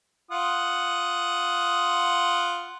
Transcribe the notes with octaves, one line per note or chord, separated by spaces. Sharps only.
F4 F#5 D#6